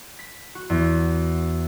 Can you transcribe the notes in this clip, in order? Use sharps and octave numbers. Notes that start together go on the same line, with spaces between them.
B6
F#4
E2